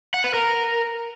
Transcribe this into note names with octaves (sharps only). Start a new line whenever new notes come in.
F#5
B4
A#4